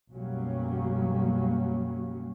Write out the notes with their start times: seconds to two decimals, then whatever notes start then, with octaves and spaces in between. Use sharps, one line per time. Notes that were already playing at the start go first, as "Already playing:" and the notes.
0.11 B1 F#2 F#3 G3 A#3 C#4